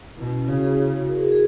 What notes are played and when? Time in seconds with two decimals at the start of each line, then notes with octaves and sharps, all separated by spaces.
0.17 B2 E4
0.27 C#4
0.37 E4
0.48 C#3 F#4
0.62 G#4
0.78 E4
0.93 F#4
1.09 A#4
1.15 G#4
1.23 F#4
1.32 G#4